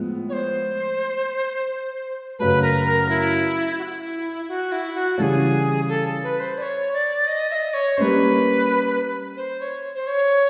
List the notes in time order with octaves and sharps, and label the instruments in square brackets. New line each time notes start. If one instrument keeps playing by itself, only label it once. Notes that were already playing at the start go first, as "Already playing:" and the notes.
Already playing: [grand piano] A2 F3 G#3 B3
[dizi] C#5
C5
[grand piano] F#2 C#3 F#3 A3 [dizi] B4
[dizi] A#4
A#4
E4
F#4
E4
F#4
E4
F#4
[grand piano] C#3 E3 G3 [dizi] G#4 A4
[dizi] A4
B4
C5
D5
C#5
D5
D#5
E5
D#5
C#5
[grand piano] G3 A#3 C#4 [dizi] B4 C5
[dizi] C5
C#5
C5
C#5